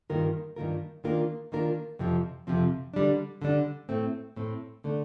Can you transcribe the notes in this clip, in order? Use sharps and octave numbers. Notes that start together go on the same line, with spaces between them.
G2 D#3 A#3 F4 A#4
G2 D#3 A#3 F4 A#4
D#3 A#3 D4 F4 A#4
D#3 A#3 D4 F4 A#4
F2 C3 F3 C4
F2 C3 F3 C4
D3 G3 D4
D3 G3 D4
A2 A3 C4
A2 A3 C4
D3 A3 D4